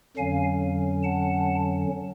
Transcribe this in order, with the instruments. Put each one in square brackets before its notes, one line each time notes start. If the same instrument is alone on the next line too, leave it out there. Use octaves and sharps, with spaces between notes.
[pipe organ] F2 D3 F#3 C#4 F5 G#5
F#5 A5